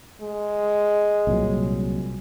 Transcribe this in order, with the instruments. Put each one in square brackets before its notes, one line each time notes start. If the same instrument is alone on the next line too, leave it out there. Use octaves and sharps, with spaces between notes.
[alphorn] G#3
[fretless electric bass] C2 A#2 F#3